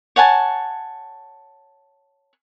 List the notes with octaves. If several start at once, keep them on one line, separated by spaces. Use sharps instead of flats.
C#5 F#5 G#5 A5